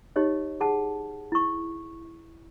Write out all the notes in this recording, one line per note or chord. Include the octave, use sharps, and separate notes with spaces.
D#4 G4 C#5 D#5
G#4 F#5 A5
E4 C#6